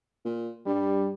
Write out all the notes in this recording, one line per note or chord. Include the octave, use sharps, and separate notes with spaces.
A#2
G2 G3